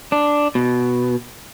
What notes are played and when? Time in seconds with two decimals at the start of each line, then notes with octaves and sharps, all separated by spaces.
0.12 D4
0.55 B2